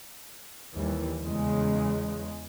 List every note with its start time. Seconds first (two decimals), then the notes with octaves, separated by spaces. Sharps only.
0.75 D#2 E3 G3
1.21 E2 C#3 G#3